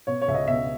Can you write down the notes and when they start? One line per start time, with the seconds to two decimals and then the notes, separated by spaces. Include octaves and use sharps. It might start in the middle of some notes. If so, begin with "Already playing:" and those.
0.07 B2 C#5
0.22 C#5
0.28 C#2 E5
0.35 D#5
0.48 B2 E5